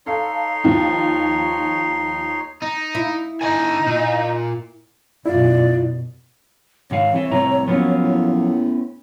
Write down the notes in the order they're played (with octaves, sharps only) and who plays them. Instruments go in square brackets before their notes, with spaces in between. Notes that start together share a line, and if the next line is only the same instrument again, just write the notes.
[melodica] D#4 C#5 C6 [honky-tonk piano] A4 F5
[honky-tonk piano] D#2 D#3 F3
[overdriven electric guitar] D#4
[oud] E4
[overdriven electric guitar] D3 G#5 [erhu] D#4
[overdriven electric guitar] A#2
[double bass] F#2 B2 [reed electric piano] E4 F4 [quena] D5
[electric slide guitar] G#2 D#3 F5 [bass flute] C#5
[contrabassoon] C2 [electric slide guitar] E3 E5
[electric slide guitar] A2 G3 A#5 [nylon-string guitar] C3
[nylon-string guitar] F3 F#3 A#3 [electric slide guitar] B3 C#4
[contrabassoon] A2